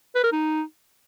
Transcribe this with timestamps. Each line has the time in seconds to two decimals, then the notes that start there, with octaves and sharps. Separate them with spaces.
0.15 B4
0.24 A#4
0.32 D#4